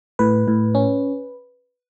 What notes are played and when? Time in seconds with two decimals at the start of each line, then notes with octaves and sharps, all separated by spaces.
0.19 A2 B4
0.48 A2
0.75 C#4